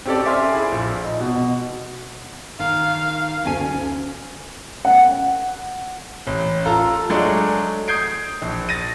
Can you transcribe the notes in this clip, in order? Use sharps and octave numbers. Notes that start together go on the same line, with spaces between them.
C4 C#4 G4 A4 D5
D5 E5 G#5 C6 D6 F6
E4 G#4
A#1
D#4
B2
D#3 F5
D2 C#4 G#5
F#5
A1
F4 A4 A#5
F#3 G#3 A3 D4
D#6 G6 G#6 C7 D7
A#1
A6 A#6 D#7